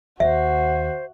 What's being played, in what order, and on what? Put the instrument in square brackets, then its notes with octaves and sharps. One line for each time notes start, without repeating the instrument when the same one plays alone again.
[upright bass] D#2 [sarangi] F#4 [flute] C5 [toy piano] E5